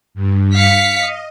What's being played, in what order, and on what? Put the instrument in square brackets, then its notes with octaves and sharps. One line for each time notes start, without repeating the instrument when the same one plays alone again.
[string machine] G2
[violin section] F5 B6 C#7
[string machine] D#5